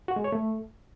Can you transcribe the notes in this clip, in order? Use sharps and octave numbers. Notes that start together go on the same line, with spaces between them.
F#4
G#3
C#5
A3